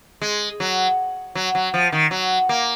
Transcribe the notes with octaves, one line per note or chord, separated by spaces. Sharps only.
G#3
F#3
F#3
F#3
F3
D#3
F#3
A#3